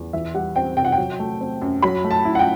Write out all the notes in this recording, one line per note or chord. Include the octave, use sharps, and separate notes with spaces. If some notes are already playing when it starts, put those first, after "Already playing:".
Already playing: E2
E3 E5
G3 F#5
C4 G5
C3 G5
F#5
G5
F#3
A3
C4
F#2
F#3 B5
A3
A5
E4
F#5
G5